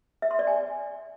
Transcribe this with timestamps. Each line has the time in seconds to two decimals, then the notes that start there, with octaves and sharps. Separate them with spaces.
0.22 E5
0.31 C6
0.39 D5
0.47 G#5